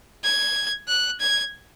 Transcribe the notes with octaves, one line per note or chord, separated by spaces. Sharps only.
G#6
F#6
G#6